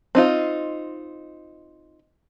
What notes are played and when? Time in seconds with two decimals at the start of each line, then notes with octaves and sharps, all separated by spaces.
0.15 C4 D#4 F4